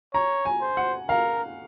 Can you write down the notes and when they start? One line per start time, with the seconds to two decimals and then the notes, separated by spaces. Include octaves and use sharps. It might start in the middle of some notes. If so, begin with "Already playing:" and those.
0.14 C#5 A#5
0.45 G#5
0.61 C5
0.77 F#5
1.09 A#4 F5